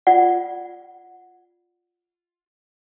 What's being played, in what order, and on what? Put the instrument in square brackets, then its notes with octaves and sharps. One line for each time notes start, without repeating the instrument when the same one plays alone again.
[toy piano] F4 D5 F#5